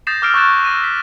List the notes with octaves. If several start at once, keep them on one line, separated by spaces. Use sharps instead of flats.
D#6 G6 A6 A#6 C7 E7
D6 E6 F6 A6 C7 D7
C#6 D6 F#6 G6 A6 E7
E6 A#6 D#7
B6